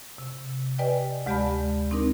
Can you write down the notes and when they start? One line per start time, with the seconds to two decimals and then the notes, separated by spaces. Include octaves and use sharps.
0.18 C3
0.78 G4 B4 D5 D#5 G5 G#5
1.26 D2 G#3 G4 D5 A5 B5
1.91 C4 D4 D#4 A#4